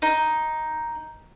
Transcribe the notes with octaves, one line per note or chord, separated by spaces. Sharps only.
D#4